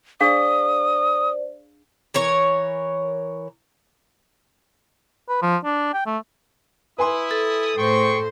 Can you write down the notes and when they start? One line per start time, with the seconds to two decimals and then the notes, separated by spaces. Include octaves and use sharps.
0.21 D4 G#4 C5 D5 F5 D#6
2.14 E3 A#4 C#5
5.29 B4
5.42 F3
5.64 D4
5.94 G5
6.06 A3
6.98 E4 B4 G#5 C6 D#6
7.31 A4
7.77 A2 G#4 C5 G5 C#6